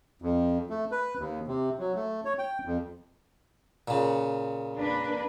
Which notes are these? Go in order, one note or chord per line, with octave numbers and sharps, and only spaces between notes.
F2
A3
B4
D#2
C3
F#3
A3
C#5
G5
F2
A#2 C#3
A#3 D4 B4